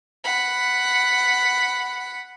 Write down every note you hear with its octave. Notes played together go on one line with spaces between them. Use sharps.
F#5 B5